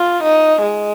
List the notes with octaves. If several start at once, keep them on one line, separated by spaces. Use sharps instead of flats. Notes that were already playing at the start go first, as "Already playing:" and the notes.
Already playing: F4
D#4
G#3